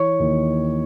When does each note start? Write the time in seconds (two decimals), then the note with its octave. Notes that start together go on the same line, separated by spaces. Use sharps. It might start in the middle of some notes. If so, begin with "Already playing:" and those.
Already playing: E3 C#5 C#6
0.19 D#2